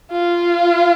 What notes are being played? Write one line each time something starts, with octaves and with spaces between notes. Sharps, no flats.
F4